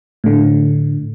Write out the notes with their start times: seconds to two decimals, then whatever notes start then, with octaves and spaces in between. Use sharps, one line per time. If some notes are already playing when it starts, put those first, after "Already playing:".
0.24 A2 D3